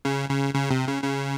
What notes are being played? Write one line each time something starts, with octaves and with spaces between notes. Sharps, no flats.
C#3
C#3
C#3
C3
C#3
C#3